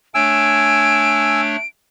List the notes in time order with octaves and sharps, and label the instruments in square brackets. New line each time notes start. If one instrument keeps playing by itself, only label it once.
[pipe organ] A3 D4 C#5 [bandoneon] G#5 E6 [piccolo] D7